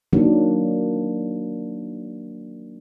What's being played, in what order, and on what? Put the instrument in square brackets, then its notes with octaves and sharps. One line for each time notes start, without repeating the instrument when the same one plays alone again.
[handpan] D#3 F#3 A#3 D4